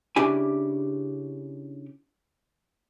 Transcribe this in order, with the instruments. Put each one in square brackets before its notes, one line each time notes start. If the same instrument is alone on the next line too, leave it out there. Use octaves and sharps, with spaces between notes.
[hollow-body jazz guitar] C#3 D4 E4 G4 G#5